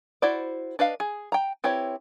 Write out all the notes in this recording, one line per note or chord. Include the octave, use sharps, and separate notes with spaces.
E4 F#4 C5 D5
D4 B4 D#5 F5
G#4
G5 A#5
C4 E4 G4 B4 C#5